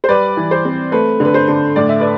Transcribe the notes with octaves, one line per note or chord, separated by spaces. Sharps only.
C5
G3 B4 D5
E3
C5
C4
A3 B4
D3 B4
C5
D3
A2 D5
E5
B4 D5